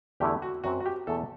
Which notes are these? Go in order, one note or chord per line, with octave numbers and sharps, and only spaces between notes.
E2 D3 A3 E4 G4
F#4
F#2 F#3 C4 F#4
F#4
G4
E2 B2 A3 A4